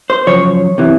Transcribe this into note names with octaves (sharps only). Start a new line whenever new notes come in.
C5
F#2 C#3 F3 C#5
C3 E3